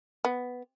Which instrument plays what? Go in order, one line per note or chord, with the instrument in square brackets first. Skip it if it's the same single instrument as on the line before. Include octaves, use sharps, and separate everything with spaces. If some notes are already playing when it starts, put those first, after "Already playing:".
[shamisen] B3